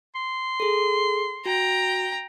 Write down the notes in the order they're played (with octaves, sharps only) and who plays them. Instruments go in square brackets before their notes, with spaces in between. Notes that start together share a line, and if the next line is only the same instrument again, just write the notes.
[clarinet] C6
[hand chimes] G#4 A4
[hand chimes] F#4 [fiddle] G5 A#5